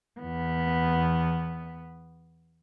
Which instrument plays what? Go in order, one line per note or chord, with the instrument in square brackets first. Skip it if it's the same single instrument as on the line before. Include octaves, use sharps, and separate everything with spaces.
[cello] E2 B3